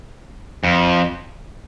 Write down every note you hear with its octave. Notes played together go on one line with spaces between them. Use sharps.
F2